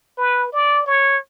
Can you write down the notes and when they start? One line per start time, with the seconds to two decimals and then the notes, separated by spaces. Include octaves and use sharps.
0.18 B4
0.53 D5
0.86 C#5